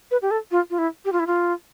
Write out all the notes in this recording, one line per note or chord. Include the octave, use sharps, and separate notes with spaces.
B4
G4
A4
F4
F4
E4
G4
F4
E4
F4